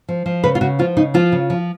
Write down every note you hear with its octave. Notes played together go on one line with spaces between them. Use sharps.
F3
F3
C#3 B4
F4
C#3 F#4
F3 F4
C#3 D#4
F3 F4
C#3
F3